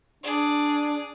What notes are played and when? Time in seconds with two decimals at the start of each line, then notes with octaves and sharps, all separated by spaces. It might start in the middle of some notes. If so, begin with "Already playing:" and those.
0.23 D4 G#4 D5